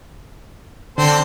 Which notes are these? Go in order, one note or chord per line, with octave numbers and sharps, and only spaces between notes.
D3 C4 A4 C5